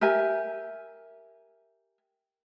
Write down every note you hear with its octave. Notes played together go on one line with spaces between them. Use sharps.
G4 A#4 E5 G#5